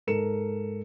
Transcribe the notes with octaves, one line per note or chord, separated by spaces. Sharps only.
G#2 A4 A#4 C#7 E7